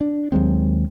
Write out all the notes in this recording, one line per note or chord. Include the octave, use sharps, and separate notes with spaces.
D4
D#2 F#3 G#3 C4